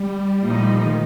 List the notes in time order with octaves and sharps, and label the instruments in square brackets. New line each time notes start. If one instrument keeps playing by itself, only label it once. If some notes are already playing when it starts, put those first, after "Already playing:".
Already playing: [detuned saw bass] G3
[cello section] A#2 F3 A3 D#4
[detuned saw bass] D#3